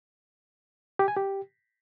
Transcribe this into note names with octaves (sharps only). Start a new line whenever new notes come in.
G4
G#5
G4